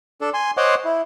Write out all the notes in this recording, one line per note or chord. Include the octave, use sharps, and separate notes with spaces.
D4 A4
G#5 C6
C5 C#5 D#5 F#5 C6 D6
E4